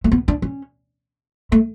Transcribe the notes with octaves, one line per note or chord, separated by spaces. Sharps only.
A3
B3
D4
C#4
A3